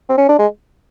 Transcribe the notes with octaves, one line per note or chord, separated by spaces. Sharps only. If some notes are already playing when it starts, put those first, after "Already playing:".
C4
C#4
D4
G#3